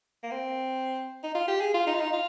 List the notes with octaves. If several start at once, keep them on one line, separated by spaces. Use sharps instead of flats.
A#3
C4
D#4
F4
G4
G#4
F4
D#4
F4
D#4
F4